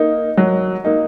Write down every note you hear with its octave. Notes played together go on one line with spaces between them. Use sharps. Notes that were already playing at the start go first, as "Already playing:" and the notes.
Already playing: A#3 D#4
F#3
A#3 D#4